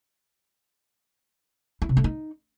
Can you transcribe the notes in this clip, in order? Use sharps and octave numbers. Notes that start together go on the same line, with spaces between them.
E4
C3
A3
D#4